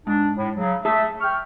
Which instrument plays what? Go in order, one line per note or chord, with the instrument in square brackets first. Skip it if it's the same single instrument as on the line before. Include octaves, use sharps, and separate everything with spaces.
[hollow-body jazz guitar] G#2 [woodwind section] D4
[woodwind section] A2
C#3 F#3
[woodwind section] A3 E5 [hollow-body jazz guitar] G#4 A5
[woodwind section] G5 C#6 F6